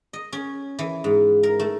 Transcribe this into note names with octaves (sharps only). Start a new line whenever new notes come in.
D#5
C#4
E3
G#2
A#4
A3